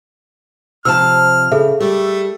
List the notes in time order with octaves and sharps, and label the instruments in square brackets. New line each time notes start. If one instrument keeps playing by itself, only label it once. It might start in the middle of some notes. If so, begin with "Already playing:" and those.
[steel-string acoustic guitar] C3 F3 A5 [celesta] E6 [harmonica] F6
[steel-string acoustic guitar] C#3 [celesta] G#4 A4 E5
[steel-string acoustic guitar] G3 [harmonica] A3